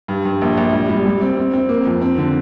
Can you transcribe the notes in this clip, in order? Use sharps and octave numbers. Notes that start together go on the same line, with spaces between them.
G2
G2
A#1
A#1
G3
G3
G3
C4
C4
C4
A#3
F2
C4
D3